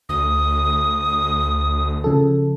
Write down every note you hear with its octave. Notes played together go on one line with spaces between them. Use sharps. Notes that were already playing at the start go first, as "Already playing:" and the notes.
D2 D#6
C#3 F3 A4